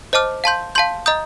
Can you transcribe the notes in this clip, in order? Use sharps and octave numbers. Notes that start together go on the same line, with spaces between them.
C5 D#5 A5 D6 F6
F5 A5 C6 G6
F5 A5 C6 G6
D#5 A#5 D#6 G6